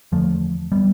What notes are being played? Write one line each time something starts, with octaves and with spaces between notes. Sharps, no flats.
E2 D3 F3 A3
G3 B3